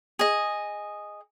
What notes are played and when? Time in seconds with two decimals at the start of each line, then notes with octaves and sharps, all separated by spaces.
0.19 G#4 D#5